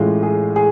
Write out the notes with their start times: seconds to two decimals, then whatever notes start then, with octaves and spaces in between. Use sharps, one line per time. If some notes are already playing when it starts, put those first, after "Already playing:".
Already playing: A1 A2 G#3 F4
0.23 G#4
0.56 G#4